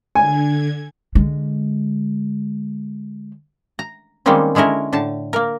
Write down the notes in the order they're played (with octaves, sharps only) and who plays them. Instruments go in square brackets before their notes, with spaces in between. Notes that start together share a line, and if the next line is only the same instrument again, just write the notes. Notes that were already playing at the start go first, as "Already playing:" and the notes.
[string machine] D3 G#6 [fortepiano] G#5
[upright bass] D3 G#3
[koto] A#5
D#3 G3 G#3 A#3 C4 C#4
D3 G#3 C#4 E4 A#4
A2 D3 A5
A#3 A#4